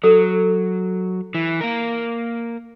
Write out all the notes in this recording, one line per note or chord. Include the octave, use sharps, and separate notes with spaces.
F#3 A4
E3
A#3 A#4